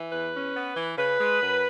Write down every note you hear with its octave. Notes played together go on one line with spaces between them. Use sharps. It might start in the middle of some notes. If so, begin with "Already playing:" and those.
Already playing: E3
E2 B4
C#4
B3
E3
C#3 B4
G#3
F#2